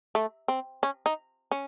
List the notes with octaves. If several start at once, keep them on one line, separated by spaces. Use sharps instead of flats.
A3
C4
C#4
D#4
C#4